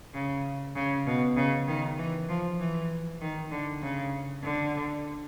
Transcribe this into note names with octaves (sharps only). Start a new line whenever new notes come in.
C#3
C#3
B2
C#3
D#3
E3
F3
E3
D#3
D3
C#3
D3